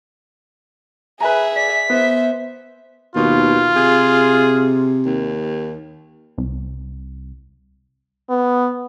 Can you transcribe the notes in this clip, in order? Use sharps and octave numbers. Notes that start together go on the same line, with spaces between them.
G#4 B4 E5 G#5 A#5
D5 B6
B3 C5 E5
D#2 B2 F4
C3 G#4
D#2
C2
B3